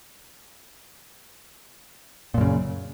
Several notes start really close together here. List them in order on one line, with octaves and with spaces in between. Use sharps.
A#2 F#2 C#3